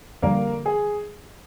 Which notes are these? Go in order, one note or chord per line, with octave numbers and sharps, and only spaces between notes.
F2 D3 G3 A#3 A#4
G#4